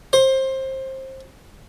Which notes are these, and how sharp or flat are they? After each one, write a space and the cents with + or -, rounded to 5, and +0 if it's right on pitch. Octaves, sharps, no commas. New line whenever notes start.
C5 +20